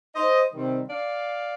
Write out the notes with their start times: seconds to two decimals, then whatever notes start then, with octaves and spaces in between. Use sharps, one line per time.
0.15 C5 D#5
0.53 C3 D#3 G3 C4
0.90 D5 F5